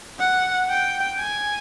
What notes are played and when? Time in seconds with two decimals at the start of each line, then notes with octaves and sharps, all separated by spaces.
0.20 F#5
0.70 G5
1.20 G#5